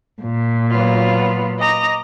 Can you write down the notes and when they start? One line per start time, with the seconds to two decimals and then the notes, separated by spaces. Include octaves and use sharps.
0.22 A#2
0.71 F#3 B3 F4
1.59 D#5 A#5 D6